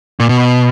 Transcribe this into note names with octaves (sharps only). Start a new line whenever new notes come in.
A#2
B2